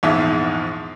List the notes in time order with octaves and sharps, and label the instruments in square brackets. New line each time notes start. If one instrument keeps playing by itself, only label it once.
[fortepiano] A#1 E2 G#2 F3 E5